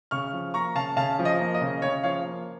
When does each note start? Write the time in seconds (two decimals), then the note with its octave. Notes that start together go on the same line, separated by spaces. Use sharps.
0.11 C#3 C#6 F6
0.33 F3
0.54 A#3 A#5 C#6
0.75 C#3 F5 A5
0.97 C#3 F5 A5
1.19 F3
1.25 D#5
1.40 A#3
1.54 D#5
1.61 C#3
1.82 C#3 C#5
2.03 F3 C#5 F5
2.26 A#3